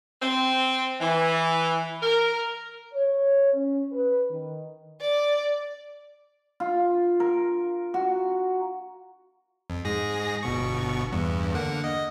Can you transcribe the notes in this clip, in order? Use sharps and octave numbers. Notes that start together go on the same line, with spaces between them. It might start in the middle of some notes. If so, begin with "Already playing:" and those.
C4
E3
A#4
C#5
C#4
B4
D#3
D5
F4
A#4
F#4
F2
G#2 G#4 A#6
G1 B2 C#6
E2 G2
D3 A#3 F#5
D#5